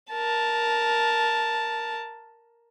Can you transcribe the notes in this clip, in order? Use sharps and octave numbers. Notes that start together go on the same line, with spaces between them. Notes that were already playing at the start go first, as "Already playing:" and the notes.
A#4 A5